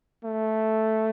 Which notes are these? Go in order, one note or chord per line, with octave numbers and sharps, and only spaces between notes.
A3